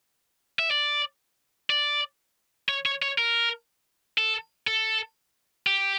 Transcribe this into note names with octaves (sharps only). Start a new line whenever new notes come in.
E5
D5
D5
C#5
C#5
C#5
A#4
A4
A4
G4